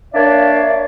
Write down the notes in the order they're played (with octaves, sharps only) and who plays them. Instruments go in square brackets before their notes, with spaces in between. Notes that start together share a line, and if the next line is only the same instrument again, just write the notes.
[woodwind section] A#3 D4 C#5 D5 E5 F5